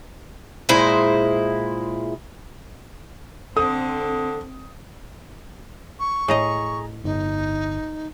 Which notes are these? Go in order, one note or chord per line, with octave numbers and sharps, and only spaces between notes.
A#2 G#3 E4 C5
D3 C4 A4 D#6
C#6
A2 G#4 D#5 A#5
G1 D#4